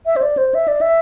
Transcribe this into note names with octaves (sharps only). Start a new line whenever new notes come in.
E5
C5
D5
C5
E5
D5
E5